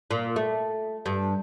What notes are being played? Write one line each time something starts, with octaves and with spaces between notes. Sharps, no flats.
A#2
A3
G2